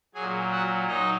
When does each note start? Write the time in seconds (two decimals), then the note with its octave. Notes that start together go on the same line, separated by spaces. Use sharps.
0.14 A#2 F#3 G#4 G#5
0.51 F#4 F#5
0.88 F#3 D#4 D#5